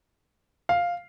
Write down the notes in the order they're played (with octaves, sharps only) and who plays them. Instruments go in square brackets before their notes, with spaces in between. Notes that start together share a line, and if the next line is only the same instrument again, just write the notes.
[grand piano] F5